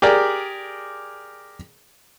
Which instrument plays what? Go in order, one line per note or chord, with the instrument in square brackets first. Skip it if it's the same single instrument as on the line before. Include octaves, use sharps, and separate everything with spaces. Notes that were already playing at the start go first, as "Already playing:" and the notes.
[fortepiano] G4 G#4 A#4 D5